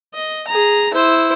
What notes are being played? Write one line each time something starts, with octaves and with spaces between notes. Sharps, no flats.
D#5
G#4 A#5
E4 C5